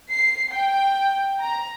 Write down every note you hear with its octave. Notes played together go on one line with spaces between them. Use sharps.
C7
G5
A#5